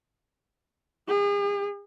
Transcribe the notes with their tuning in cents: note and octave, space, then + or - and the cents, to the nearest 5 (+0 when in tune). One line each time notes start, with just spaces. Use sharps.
G#4 -40